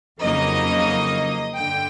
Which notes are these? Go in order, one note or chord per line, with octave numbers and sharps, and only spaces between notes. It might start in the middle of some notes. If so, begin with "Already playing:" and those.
F2 C#3 F#3 A#3 D#4 D#5
G2 D3 G5